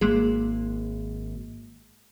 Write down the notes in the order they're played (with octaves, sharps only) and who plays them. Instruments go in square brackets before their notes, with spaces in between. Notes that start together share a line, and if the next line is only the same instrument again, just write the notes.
[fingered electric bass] G#1 [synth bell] G#3 A#3 G#4